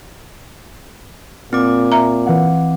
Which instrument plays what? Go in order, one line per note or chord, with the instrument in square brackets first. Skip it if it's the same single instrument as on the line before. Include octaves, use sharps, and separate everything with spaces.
[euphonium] A#2 [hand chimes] C4 D6
[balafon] E5 A#5
[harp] E3 F5 F#5